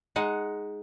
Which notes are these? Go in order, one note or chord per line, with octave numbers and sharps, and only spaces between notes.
G#3 D#4 F#5